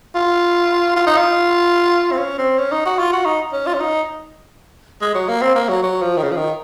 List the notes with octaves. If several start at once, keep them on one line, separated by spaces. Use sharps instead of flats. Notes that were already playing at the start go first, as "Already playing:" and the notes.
F4
F4
D#4
F4
C4
C#4
C4
C#4
D#4
F#4
F4
F#4
D#4
C#4
F4
C#4
D#4
G#3
F#3
A#3
C4
A#3
F#3
F#3
F3
D#3
C#3
F3
D#3